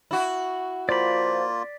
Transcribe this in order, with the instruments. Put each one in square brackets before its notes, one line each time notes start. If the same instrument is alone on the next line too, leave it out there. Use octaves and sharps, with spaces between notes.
[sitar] E4 F#4
[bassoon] F3 [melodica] A#3 F4 [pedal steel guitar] D5 B5